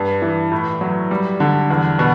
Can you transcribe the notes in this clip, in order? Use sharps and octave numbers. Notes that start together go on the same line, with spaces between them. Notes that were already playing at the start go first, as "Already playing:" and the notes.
Already playing: G2
E3
A2
F#3
G3
D3
E2
B2